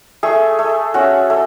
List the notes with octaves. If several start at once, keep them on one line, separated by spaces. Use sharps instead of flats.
A3 G#4
A3
C#4 F#4
A3